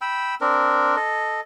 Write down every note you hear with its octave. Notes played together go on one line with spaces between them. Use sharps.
G5 B5 E6
C4 D4 A#4
A4 D#5